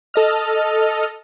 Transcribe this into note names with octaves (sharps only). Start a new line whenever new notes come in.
A4 D#5 F6